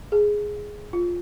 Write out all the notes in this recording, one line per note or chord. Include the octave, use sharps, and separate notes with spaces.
G#4
F4